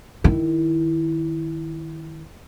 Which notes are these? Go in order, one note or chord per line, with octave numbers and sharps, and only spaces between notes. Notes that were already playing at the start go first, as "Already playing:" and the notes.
D#3 E4